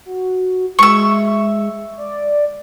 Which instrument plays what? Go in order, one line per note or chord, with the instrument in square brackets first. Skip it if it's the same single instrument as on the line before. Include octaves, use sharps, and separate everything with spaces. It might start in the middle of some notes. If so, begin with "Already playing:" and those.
[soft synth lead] F#4
[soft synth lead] G#3 [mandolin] E5 C#6
[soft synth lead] D5